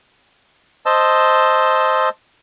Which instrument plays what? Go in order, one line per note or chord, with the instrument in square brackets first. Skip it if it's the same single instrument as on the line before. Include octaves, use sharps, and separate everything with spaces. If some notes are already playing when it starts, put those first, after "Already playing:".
[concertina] C5 D#5 A5 E6